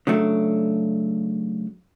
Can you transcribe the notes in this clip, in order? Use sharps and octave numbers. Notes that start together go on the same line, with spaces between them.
C#3 F#3 A3 D4